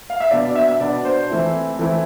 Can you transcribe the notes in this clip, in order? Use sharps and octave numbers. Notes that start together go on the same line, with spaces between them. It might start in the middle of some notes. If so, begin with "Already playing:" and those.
F5
E5
B2 B3 D4 D5
D5
E5
E5
B2 B3 D4 D5
D5
C5
E3 A3 C4 E4
E3 A3 C4 E4